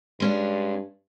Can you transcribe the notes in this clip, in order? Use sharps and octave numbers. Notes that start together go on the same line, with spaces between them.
G2 G#3 C#4 D4